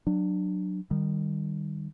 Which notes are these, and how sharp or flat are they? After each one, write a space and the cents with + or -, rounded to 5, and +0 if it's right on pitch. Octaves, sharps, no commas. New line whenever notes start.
F#3 +0 D4 +20
D#3 -25 G3 +0